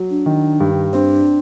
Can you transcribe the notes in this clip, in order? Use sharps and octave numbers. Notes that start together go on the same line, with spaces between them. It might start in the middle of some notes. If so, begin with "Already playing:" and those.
Already playing: F#3
D4
D#3
G2
C4 D4